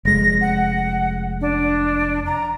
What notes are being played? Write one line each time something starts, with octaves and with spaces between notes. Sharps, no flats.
F1 G#3 A#6
F#5
D4
A#5